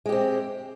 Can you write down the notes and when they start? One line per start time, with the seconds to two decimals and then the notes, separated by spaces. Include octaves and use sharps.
0.06 G#3
0.09 G4
0.12 C4